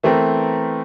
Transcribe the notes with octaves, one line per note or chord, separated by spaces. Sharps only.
E3 A3 B3 C4 A#4